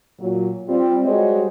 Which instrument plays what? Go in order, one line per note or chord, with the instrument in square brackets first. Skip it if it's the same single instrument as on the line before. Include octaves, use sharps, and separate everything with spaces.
[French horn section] A#2 F#3
G3 C4 F4
G3 G#3 F#4 C5 C#5 D#5